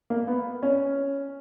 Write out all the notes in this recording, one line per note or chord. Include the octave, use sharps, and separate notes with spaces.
A#3
B3
C#4